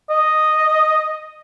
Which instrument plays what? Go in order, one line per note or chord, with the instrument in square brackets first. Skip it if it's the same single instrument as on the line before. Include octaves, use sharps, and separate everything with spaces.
[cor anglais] D#5